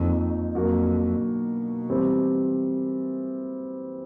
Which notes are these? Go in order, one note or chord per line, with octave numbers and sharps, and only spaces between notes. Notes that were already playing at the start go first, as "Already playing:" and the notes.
Already playing: F2 F3 A#3 D#4
F2 F#3 A#3 D4 F#4 A#4
B2
E3 G3 C4